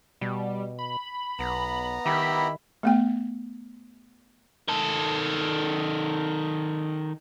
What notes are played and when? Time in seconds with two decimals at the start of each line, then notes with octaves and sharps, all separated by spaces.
0.21 B2 G3
0.79 B5
1.39 B1 B3 A#5
2.06 D#3 G4 E5 B5
2.83 A3 B3 G5
4.68 D#3 A4